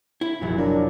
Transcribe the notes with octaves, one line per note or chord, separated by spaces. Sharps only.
E4 B5
F1 A#1 F#2
A#3 D4